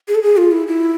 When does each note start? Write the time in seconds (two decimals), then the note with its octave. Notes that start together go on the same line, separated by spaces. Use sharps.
0.08 G#4
0.15 A4
0.23 G#4
0.37 F4
0.52 E4
0.67 E4